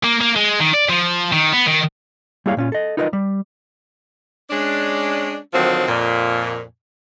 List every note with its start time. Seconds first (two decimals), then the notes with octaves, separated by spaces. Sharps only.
0.04 A#3
0.21 A#3
0.36 G#3
0.60 D#3
0.74 D5
0.90 F3
1.33 D#3
1.53 B3
1.67 D#3
2.46 G3 A#3 E4 G#4 C#5 F5
2.57 A#2 C#4 F4
2.72 A4 D#5
2.97 D#4 F4 A#4 B4 C#5 D#5
3.13 G3
4.50 G#3 C#4 D4
5.53 D3 D#3 F3 F#3 C4
5.88 F2 A#2